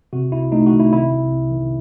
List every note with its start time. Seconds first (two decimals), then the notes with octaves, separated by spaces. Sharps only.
0.13 C3 F#4
0.32 C2 E4
0.52 A3 D#4
0.66 F#4
0.73 D#3
0.80 E4
0.93 C3 E4
1.12 C2
1.32 C2
1.51 D#3